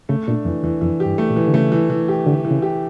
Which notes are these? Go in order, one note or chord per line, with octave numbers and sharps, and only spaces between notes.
C#3 A3
A#2 D4
F2 E3
E2 E3
F2 E3
G4
G2
A3
A#2
E3
D3
C#3 A3
E3
E3
G4
D3 G4
E3
C#3
G4